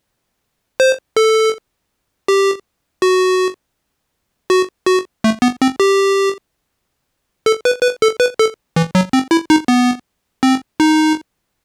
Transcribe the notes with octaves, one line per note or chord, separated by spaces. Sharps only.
C5
A4
G4
F#4
F#4
F#4
A3
B3
C4
G4
A4
B4
B4
A4
B4
A4
E3
F#3
C4
E4
D#4
B3
C4
D#4